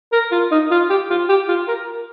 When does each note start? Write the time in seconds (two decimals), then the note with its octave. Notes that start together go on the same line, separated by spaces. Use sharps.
0.12 A#4
0.32 F4
0.51 D#4
0.71 F4
0.90 G4
1.10 F4
1.29 G4
1.48 F4
1.68 A#4